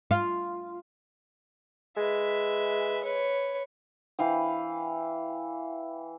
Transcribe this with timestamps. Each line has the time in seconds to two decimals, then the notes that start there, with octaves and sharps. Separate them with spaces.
0.11 F4
1.97 G#3 B4 E5
3.04 B4 C#5
4.19 E3 F5 G5